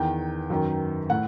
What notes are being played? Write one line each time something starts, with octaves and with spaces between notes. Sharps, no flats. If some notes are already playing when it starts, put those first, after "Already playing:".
Already playing: E2 D#3 G5
F#2 D#3
A2 F#5